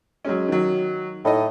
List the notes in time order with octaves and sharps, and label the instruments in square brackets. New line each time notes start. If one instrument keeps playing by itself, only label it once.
[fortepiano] F#3 G#3 C#4
D#3 F#3
[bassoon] A2 [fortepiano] D#4 D#5